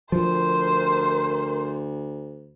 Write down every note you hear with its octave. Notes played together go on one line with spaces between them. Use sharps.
D2 F3 A#4 C5